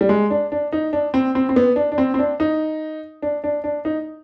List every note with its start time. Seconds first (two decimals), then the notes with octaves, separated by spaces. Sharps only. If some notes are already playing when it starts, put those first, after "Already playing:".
0.01 G3
0.09 G#3
0.30 D4
0.52 D4
0.72 D#4
0.93 D4
1.14 C4
1.35 C4
1.49 C4
1.56 B3
1.76 D4
1.92 D4
1.98 C4
2.14 C4
2.19 D4
2.40 D#4
3.22 D4
3.44 D4
3.64 D4
3.85 D#4